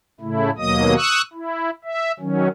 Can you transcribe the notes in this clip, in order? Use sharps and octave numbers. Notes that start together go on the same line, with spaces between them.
A2 C#3 A3 E4
D#2 B2 F#3 A#3 D#5 D#6
C#6 D#6 E6 F#6
E4
E5
D#3 F#3 C#4